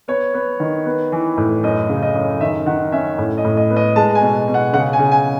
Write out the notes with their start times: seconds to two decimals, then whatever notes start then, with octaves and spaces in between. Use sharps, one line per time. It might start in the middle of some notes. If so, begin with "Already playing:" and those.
0.08 B3 C#5
0.34 B3
0.60 D#3
0.86 B3
1.12 E3
1.37 A2
1.63 F#2 D#5
1.89 C#3
2.02 D#5
2.15 F#2
2.41 D#3 E5
2.66 D#3 F#5
2.92 C#4 E5
3.18 A2
3.37 D#5
3.44 A2
3.57 D#5
3.70 B3
3.76 D#5
3.96 G#3 A5
4.15 G#5
4.22 B2
4.48 B2
4.54 F#5
4.73 C#3 F#5
4.93 G#5
4.99 C#3
5.11 G#5